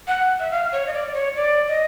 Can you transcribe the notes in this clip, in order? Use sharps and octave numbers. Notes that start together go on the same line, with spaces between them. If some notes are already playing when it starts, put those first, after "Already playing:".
F#5
E5
F5
C#5
D#5
D5
C#5
D5
D#5